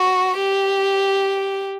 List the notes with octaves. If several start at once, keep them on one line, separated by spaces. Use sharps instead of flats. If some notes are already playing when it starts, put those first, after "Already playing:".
Already playing: F#4
G4